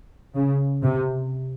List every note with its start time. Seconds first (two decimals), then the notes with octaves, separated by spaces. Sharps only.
0.36 C#3
0.82 C3